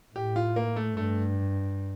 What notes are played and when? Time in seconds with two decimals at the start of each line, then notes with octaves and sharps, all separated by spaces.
0.15 A2 G4
0.36 F4
0.56 A#3
0.76 A3
0.97 G2 A3